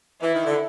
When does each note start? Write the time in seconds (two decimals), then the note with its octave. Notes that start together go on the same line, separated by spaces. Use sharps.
0.21 E3 E4
0.33 D#3
0.44 D3